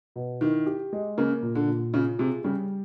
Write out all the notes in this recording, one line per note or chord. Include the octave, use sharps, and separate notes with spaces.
B2
D#3 E4
G4
G#3
C#3 A#3
A#2
D3
A#2
C#3 F4
C3 G#4
C#3 G3